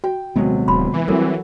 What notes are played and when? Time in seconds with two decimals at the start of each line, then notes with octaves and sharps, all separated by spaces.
0.04 F#4 G5
0.36 D#1 C3 F#3 G#3 B3
0.68 D1 B5 C6
0.93 E3
1.08 F#3 G3 A3 C4 A4 A#4